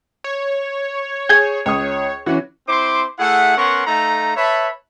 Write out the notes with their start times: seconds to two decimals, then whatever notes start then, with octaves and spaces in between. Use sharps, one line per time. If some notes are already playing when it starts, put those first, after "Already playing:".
0.24 C#5
1.29 G#4 G6 G#6
1.66 C#2 C#5 D#6
2.26 E3 C#4 F#4
2.68 C4 E4 C5 C6 D6
3.19 A3 E4 G#4 F#5
3.57 B3 C#4 A#4 F#5 C6 C#6
3.86 A3 D#4 A4 F5 A#5
4.36 B4 C#5 E5 A5 B5